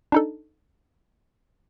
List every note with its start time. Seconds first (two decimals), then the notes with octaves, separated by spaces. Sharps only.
0.12 D4 D#4 A4